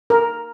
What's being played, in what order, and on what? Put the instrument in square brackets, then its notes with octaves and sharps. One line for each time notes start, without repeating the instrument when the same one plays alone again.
[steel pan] A#4